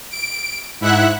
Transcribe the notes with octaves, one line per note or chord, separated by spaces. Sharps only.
D7
G#2 E4 E5 F#5 F#6